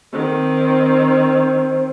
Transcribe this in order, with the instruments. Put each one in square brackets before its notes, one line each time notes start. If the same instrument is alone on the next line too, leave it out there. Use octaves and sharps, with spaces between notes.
[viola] D#3 C4 [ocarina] C5